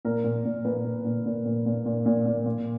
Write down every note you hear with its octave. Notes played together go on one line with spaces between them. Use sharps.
A#2 A#4
A#2
A#2
A#2 B4
A#2
A#2
A#2
A#2
A#2
A#2
A#2
A#2
A#2